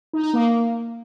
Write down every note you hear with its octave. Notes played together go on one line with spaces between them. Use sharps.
D#4
D#4
A#3